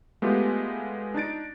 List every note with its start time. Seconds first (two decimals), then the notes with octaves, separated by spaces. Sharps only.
0.22 G#3 A3 B3 F4 G4
1.14 D4 D#4 A6 D7